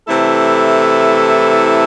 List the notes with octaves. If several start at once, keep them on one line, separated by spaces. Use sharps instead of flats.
C3 E3 A3 E4 A4